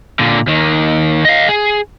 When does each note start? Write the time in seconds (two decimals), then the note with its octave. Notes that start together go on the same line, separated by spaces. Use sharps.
0.19 A#2 D3
0.47 D#2 D#3
1.25 D#5 F5
1.49 G#4